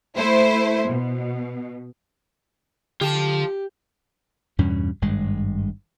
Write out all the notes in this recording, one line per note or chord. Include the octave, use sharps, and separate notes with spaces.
A3 E4 C5
B2
D3 F4 G4 A5
E2 G2 B2 C#4
G#1 G2 G#3